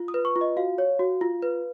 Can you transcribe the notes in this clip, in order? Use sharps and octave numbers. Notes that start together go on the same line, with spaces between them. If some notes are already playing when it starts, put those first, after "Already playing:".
Already playing: F4
D#6
B4
C#6
F4
D#5
F#4 F5
C#5
F#4
F4
B4